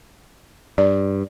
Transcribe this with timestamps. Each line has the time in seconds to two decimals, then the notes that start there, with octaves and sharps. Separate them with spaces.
0.78 G2 D5